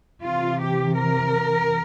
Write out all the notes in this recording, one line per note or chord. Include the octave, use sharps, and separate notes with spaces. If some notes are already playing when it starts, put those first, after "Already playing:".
C3 E3 F4
G4
A#4